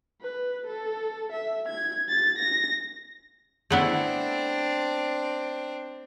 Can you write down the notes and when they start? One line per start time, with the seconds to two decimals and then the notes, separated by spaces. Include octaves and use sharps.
0.21 B4
0.67 A4
1.32 E5
1.68 G#6
2.09 A6
2.38 A#6
3.70 A3 B3 C4 D4 E4